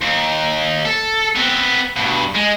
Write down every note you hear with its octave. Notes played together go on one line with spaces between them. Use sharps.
D#2
A4
B3 C4
G2 B2
G#3